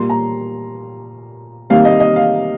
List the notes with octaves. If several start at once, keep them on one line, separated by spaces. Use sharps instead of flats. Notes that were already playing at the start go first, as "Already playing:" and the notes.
Already playing: A#2 G3 A#3 C6
A#5
C3 D#3 G3 A#3 F5
D#5
D#5
F5